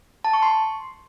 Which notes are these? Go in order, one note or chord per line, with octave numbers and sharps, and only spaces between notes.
A5
C#6
C6